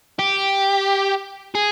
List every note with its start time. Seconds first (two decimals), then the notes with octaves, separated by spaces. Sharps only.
0.19 G4
1.55 G#4